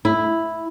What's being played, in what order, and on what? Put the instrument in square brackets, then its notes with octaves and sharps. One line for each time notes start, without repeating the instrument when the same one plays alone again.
[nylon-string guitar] E4